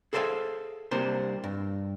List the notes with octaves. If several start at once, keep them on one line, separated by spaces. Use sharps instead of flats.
G#4 A4 C5 D5 E5 F5
C2 C3 A#3 D4 C5
G2